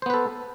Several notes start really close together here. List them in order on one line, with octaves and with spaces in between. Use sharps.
C5 B3 B4 A4